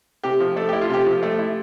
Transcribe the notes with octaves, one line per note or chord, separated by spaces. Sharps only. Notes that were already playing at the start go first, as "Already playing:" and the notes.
C3 G4
F3
A3 A4
E4 G4
F4
C3 G4
F3
A3
E4